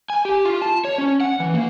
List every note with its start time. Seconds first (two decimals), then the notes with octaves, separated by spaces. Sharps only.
0.10 G#5
0.25 G4
0.45 F4
0.62 A5
0.85 C#5
0.98 C#4
1.20 F#5
1.40 E3
1.54 A#3